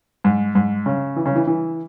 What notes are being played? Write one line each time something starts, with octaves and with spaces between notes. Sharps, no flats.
G#2
G#2
C#3
E3
C#3
E3
E3